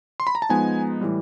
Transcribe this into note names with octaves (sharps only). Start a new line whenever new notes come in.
C6
B5
A#5
A5
F3 G#3 B3 D#4 G#5
A2 E3 G3